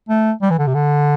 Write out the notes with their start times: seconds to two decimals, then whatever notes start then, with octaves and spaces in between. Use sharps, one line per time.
0.09 A3
0.42 G3
0.50 E3
0.59 D3
0.67 C3
0.75 D3